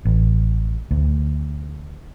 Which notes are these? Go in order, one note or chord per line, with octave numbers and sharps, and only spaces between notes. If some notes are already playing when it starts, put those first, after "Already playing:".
A1
D2